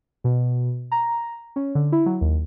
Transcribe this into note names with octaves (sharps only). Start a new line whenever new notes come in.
B2
A#5
C#4
D3
E4
F#3
D#2